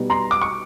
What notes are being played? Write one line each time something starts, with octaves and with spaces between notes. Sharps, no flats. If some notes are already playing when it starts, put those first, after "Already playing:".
Already playing: B2 G3 B3 D#4
A#5 C6
D6
C#6